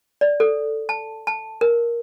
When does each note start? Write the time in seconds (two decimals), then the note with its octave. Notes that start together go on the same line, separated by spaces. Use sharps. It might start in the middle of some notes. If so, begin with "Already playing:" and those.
0.21 D5
0.40 A4
0.89 A5
1.27 A5
1.61 A#4